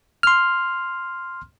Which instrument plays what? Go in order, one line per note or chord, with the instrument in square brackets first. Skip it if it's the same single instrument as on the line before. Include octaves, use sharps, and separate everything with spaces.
[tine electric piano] C6 F6